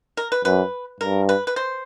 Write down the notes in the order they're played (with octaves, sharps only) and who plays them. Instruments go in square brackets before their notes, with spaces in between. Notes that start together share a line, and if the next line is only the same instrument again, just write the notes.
[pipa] A#4
B4
[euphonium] F#2 [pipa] B4
[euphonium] G2 [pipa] A#4
[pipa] B4
B4
C5